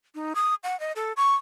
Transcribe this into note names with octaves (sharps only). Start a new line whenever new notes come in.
D#4
D#6
F#5
D#5
A4
C#6